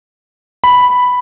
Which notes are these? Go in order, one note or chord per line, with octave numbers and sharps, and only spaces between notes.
B5